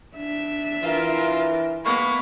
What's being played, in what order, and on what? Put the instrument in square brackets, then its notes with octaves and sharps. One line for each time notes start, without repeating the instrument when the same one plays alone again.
[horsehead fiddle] D4 E5
[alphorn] E3 [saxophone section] F4 [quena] A#4
[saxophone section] G#3 A#3 [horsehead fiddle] B3 B5 [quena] C#6